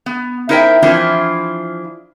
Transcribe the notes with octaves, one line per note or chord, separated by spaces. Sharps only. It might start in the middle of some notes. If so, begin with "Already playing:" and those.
B3
D#4 E4 A#4 C5 E5 G5
E3 F3 C4 D4 E4 F4